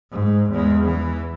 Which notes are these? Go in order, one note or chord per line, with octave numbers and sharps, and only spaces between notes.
G#2
E2 G#3
E3